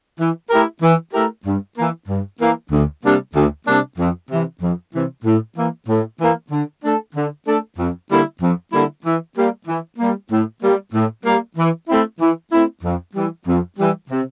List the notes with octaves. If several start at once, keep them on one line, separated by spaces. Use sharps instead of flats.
E3
A3 E4 G4 A#4
E3
A3 E4 G4 A#4
G2
E3 A#3
G2
E3 A#3
D2
C3 G3 A#3 D4
D2
C3 G3 A#3 D4
F2
C3 E3
F2
C3 E3
A2
E3 A#3
A2
E3 A#3
D3
A3 D4 A4
D3
A3 D4 A4
F2
D3 G3 A#3 E4
F2
D3 G3 A#3 E4
E3
G3 A#3
E3
G3 A#3
A2
G3 A#3
A2
G3 A#3
E3
A3 C4 E4
E3
A3 C4 E4
F2
E3 G3
F2
E3 G3
C3